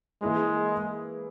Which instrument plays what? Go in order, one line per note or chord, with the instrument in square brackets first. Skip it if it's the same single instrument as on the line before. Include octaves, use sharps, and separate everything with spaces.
[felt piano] E3 A#3 E4 G#4 [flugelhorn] G#3